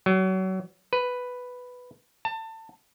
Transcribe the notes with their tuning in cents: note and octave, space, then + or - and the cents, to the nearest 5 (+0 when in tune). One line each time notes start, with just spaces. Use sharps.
F#3 +30
B4 +5
A5 +25